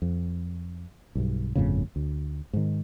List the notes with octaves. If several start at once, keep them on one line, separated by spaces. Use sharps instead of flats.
F2
B1 G2
G1 F2 A2 C#3
D2
G#2 D#3